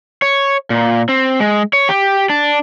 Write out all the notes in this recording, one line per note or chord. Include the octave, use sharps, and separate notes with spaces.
C#5
A#2
C4
G#3
C#5
G4
D4